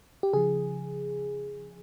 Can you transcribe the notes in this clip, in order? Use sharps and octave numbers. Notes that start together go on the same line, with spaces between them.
G4
C#3 F3 G#4